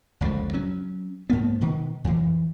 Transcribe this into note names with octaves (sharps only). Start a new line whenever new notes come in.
F#1 C#2 D3 F3
F#3 C#4
G#2 A#3 B3
B2 D#3
F2 E3